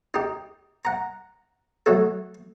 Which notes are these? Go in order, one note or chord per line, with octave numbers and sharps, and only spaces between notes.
D#4 G4
F#5 A#5
F#3 A3 A4